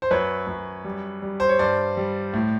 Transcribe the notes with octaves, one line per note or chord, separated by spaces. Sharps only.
C5
F#2 B4 C#5
F#2
G3
G3
C5
C#5
G2 C5 D5
G3
A2